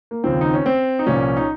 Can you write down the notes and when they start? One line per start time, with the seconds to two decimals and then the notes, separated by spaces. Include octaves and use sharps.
0.11 A#3
0.24 D#2 C#3 F3 C4
0.41 D#4
0.54 C#4
0.66 C4
0.99 D#4
1.06 C2 A#2 F3 C#4
1.37 D#4